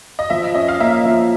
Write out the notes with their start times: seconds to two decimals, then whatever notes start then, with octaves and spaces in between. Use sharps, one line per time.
0.19 D#5
0.30 F3 E5
0.55 C#4 D#5
0.68 F5
0.80 A#3 E5
1.05 F3